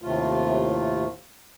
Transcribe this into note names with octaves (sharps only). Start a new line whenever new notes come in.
D#2 A2 C3 A3 F4